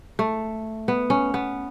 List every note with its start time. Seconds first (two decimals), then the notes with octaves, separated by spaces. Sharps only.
0.19 A3
0.88 B3
1.10 C#4
1.34 B3